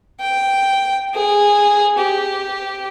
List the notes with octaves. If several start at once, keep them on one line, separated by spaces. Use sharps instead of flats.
G5
G#4
G4